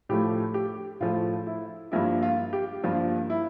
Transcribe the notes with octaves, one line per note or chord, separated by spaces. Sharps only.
A2 F3 A3 G4
G4
A2 F3 A3 F4
E4
G2 F3 A#3 E4
F4
G4
G2 F3 A#3 F4
E4